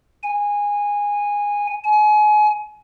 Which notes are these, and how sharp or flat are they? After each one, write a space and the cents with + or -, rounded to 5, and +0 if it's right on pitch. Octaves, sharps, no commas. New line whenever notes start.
G#5 -15
G#5 +30